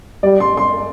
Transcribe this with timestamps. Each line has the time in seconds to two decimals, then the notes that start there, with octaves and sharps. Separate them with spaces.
0.23 G3 D5
0.40 C6
0.57 C6